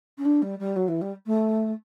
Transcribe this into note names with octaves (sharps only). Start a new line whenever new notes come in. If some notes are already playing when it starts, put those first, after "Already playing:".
C#4
D4
G3
G3
F#3
E3
G3
A3